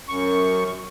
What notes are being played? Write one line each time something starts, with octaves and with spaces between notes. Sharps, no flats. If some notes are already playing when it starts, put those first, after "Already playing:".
F#2 C#6